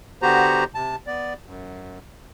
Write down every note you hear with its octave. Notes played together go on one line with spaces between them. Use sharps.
D3 B3 F#4 G4 C5 A#5
C3 A5
B3 D5
F#2